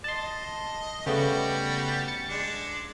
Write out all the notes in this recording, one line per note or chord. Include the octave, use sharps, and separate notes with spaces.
D#5 A5 C6
C#3 G3 A3 B3 F#4 G4
A6 C#7
G#3 D4